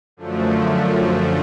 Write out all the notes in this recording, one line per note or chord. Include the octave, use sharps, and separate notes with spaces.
F#2 D3 F3 A3